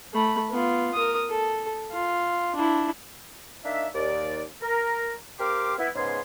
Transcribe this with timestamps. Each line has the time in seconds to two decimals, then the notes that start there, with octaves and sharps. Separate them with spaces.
0.13 A3 B5
0.50 B3 F4
0.94 A#4 D#6
1.30 A4
1.91 F4
2.55 D4 E4
3.65 A#3 D4 D#4 E5
3.94 D#2 D5
4.62 A#4
5.39 C4 G4 A#4 F5 C6 D6
5.78 B3 E4
5.96 G#2 C#3 B3 G#5 C6